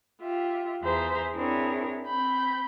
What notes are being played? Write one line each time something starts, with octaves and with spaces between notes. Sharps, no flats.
F4 G4 E5
E2 G#4 C5 E5 A#5
C4 D4 E4 G#4 A#4 C#5
C4 B5 G6